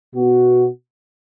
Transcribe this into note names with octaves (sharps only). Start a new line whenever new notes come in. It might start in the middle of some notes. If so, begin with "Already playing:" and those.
B2 B3 F#4